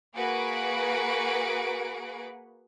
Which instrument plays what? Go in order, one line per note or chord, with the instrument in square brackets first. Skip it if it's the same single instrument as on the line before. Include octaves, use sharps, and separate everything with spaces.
[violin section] A#3 F#4 G#4 B4 F#5 D7